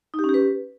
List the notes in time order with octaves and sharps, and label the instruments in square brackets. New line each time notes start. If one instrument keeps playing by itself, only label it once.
[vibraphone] D#4
G4
C#4
G4
B4